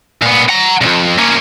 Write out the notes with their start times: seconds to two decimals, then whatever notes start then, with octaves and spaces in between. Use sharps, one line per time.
0.22 A#2 B3
0.49 F#5 A#5
0.81 B1 F2
1.18 A#3 C#4